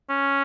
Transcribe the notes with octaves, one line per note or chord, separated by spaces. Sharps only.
C#4